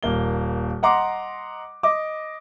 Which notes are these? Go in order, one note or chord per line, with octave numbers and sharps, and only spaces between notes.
D#1 A#3 G7
D#5 F#5 A#5 C6 D6
D#5 D6